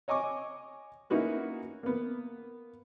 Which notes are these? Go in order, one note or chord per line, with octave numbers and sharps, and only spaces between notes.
C#5 D#5 G#5 C#6 D6
A#3 C#4 D#4 E4 F#4 B4
A#3 B3